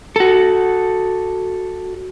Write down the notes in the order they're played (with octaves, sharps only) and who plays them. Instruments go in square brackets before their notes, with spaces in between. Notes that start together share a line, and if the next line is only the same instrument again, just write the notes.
[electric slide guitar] F#4 A4